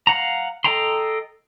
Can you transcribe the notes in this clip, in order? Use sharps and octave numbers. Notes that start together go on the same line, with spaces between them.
F5 F#5 A#5
A4 D#5 G5 A#5 C6